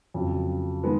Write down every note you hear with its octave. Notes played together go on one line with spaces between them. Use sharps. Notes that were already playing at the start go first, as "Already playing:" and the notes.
F2 C#3 F#3
D#3 G#3 B3